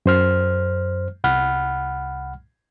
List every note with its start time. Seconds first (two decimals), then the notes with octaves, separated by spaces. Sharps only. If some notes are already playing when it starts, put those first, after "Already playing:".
0.06 F#2 C5 F6
1.24 C2 F#5 B5 F6